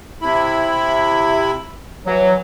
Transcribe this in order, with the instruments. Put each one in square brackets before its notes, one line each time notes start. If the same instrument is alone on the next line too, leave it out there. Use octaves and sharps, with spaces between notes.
[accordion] C3 E4 B5
[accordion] E3 [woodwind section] F#3